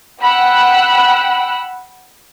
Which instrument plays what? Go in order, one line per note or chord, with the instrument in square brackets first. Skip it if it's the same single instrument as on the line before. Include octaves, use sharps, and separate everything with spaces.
[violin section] F#5 G5 B5 E6 F#6